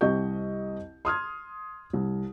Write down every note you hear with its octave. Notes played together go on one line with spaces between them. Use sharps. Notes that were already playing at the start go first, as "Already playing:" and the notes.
C2 C4 G4 D#5 C#6 G6
C6 D#6 F6 G#6
C2